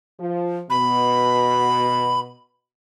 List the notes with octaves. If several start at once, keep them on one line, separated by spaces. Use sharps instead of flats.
F3
B2 B5